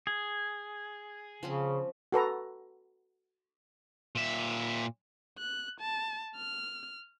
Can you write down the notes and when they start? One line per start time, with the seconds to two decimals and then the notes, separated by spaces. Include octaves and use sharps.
0.07 G#4
1.43 C#3 F3 C4 C#4
2.12 F#4 A4 B4 A#5
4.15 A#2 E5
5.38 F#6
5.80 A5
6.36 F6